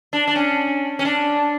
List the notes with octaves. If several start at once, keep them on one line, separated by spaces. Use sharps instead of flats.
D4
D4
C#4
C#4
D4